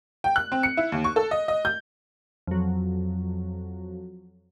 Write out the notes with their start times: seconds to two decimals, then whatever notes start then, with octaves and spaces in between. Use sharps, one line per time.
0.24 G5
0.36 F#6
0.52 C4
0.63 C#7
0.77 E4
0.92 D#2
1.04 C#6
1.16 A4
1.31 D#5
1.48 D#5
1.65 G6
2.47 F2 F#3